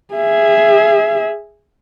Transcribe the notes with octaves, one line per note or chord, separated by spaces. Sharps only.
G#4 E5